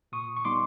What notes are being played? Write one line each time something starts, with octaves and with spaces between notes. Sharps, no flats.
A#2 C#6 D#6
C#6
G3 B3 D#4 C6 D6